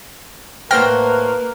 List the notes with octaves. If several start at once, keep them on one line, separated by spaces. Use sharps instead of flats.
A2 A#3 B4 C5 F#5 G5 F6 A#6